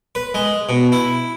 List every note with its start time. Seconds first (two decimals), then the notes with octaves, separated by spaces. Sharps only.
0.15 B4
0.34 G#3
0.69 B2
0.92 E4